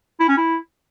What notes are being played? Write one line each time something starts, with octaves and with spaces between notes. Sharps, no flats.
E4
C#4
E4